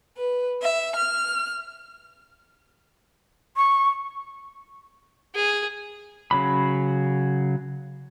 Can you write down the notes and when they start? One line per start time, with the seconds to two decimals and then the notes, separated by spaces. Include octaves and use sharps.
0.18 B4
0.62 E5
0.97 F6
3.56 C#6
5.35 G#4
6.31 C#3 F#3 B5